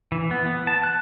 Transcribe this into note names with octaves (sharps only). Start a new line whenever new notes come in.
E3
B3
B3
A5
F#6